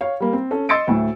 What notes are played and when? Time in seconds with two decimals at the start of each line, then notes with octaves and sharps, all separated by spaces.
0.01 C#5 F5
0.20 G3 A#3
0.33 C4
0.51 C#4 A4
0.69 D#5 C6 E6 A6 C#7 D7
0.87 D2 A2